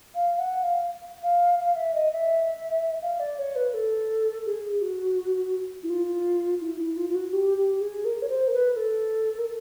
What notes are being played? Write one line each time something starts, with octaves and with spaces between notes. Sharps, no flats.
F5
F#5
F5
F5
F5
E5
D#5
E5
F5
D5
C#5
B4
A4
G#4
F#4
E4
F4
E4
E4
F4
F4
F#4
G4
G4
G#4
A#4
C#5
C5
A#4
B4
A4
A#4